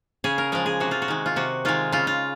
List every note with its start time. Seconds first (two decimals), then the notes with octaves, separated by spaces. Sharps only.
0.24 C#3 G#4
0.38 A#4
0.52 F3 G#3 A#4
0.66 G#4
0.80 C3 F#4
0.91 F4
1.02 F#4
1.08 D#3 G#3
1.26 F4
1.36 C3 F#4
1.65 D#3 G#3 F4
1.92 C#3 F4
2.07 F4